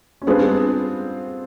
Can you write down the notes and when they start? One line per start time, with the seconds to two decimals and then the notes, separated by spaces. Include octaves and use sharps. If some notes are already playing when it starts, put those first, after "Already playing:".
0.22 C#4
0.27 G3 B3 C4 D4 F4 G#4